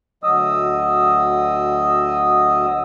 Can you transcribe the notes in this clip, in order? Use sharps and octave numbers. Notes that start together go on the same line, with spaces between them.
D2 F#3 D#5 D#6 E6